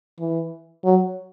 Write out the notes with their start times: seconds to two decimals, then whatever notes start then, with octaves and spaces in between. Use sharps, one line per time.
0.19 E3
0.84 F#3